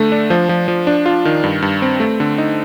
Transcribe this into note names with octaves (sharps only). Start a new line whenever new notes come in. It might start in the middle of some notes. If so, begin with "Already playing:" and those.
Already playing: D3 A3
D4
F3
F3
F3
D4
F4
D#3
G2
G2
C4
A3
D3
D#4